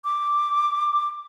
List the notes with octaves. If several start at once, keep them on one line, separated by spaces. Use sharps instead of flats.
D6